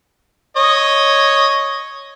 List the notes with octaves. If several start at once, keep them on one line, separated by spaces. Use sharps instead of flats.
C#5 D#5